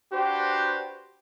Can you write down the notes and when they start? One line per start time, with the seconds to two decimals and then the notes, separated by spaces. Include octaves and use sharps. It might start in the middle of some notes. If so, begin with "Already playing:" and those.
0.12 D4 F#4 G4 B4 C5